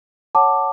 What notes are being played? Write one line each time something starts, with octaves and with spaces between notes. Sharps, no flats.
C#5 F#5 A5 D6